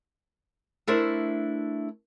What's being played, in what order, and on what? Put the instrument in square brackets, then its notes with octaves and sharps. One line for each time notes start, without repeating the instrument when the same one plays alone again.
[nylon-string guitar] A3 D4 E4 A#4 C5 E5